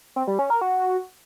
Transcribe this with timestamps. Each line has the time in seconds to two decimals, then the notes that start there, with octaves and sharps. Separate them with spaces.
0.16 C4
0.27 G3
0.39 C#4
0.50 A#4
0.61 F#4